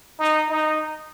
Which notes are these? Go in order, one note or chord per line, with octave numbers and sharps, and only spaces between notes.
D#4
D#4